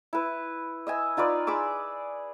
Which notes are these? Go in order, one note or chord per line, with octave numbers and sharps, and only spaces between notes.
E4 B4
D#5 E5 G#5
D#4 F4 B4 D5
G#4 B5 D6 E6